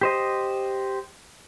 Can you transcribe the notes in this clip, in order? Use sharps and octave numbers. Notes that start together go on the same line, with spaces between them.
G4 C5 D#5